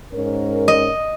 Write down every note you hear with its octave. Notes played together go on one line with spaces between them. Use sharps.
G#2 C#4 A#4
D#5